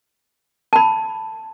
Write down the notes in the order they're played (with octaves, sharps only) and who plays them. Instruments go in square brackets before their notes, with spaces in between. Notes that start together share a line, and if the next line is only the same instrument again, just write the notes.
[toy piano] A5 B5